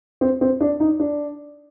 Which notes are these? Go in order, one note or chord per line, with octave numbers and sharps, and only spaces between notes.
C4
C4
D4
D#4
D4